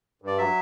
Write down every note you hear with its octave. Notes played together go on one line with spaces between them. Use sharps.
G2
D5
F#3 E5